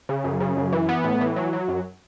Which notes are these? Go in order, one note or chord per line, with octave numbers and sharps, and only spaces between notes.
C#3
F#2
C#3
F#2
E3
B3
A2
E3
F#3
F#3
F#2